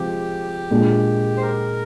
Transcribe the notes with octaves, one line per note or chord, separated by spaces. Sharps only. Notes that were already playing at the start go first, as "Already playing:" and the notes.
Already playing: C3 F3 G#3 G4
A#2 G#3 D4
C5
A#4